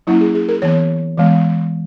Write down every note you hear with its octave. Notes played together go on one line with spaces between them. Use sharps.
F#3 A#3 C#4 E4
G#4
G#4
A#4
E3 B3 C#5
E3 G#3 B3